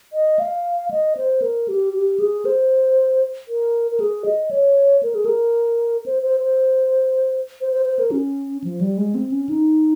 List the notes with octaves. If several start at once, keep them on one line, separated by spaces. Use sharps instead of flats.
D#5
F5
D#5
C5
A#4
G4
G4
G#4
C5
A#4
A#4
G#4
D#5
C#5
A#4
G#4
A#4
C5
C5
C5
C5
C5
C5
A#4
C#4
F3
G3
G#3
C4
C#4
D#4